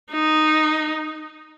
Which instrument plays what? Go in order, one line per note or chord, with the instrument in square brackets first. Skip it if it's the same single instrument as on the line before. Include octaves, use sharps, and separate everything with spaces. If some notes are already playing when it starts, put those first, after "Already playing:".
[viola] D#4